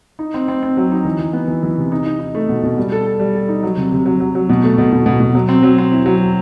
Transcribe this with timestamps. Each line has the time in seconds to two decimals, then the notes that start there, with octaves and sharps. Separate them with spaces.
0.19 D#4
0.34 C4
0.48 C4
0.63 C4
0.77 F#3
0.92 D#4
1.05 E3
1.19 E3
1.33 B3
1.48 E3
1.63 E3
1.78 C3
1.92 D#4
2.06 D#4
2.19 D#4
2.35 A3
2.49 B2
2.63 B2
2.78 G3
2.92 A4
3.05 A4
3.20 G3
3.35 A4
3.48 D#4
3.63 F#3
3.77 C3
3.92 C3
4.06 F#3
4.20 F#3
4.35 F#3
4.49 B2
4.64 A3
4.78 B2
4.92 B2
5.06 B2
5.20 B2
5.35 F#3
5.49 C4
5.63 F#3
5.78 C4
5.92 E4
6.06 F#3